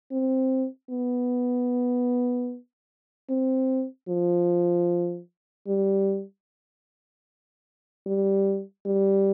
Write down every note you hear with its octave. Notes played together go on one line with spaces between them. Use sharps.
C4
B3
C4
F3
G3
G3
G3